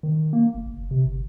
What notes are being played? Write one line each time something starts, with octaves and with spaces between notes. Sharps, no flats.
D#3
A#3
F#1
F#1
C3
G1